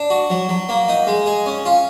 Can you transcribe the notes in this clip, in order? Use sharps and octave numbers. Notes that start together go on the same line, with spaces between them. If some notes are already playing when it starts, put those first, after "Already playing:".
Already playing: D4
F#4
F#3
F#3
A#3
D#4
G#3
G#4
C#4
F4